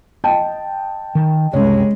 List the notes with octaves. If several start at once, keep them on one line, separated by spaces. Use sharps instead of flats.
D#5 G5 A5
D#3
F#1 C2 G#3 C#4 C#5